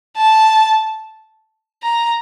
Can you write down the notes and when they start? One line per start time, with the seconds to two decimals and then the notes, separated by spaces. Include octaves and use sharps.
0.17 A5
1.83 A#5